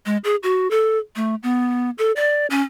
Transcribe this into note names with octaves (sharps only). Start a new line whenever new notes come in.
G#3
G#4
F#4
A4
A3
B3
A4
D5
C#4